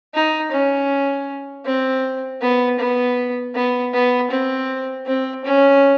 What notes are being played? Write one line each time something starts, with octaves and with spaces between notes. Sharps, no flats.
D#4
C#4
C4
B3
B3
B3
B3
C4
C4
C#4